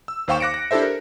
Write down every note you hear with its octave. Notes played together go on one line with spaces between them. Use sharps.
E6
D#2 C5 F5 G5 C#6 E7
D6 F#6 A#6 C#7 D7
A#6
D4 E4 G4 A4 C5 E5
A#4